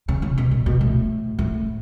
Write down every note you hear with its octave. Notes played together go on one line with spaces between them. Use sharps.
C#3
C#3
B2
A#2
B2
A2
A2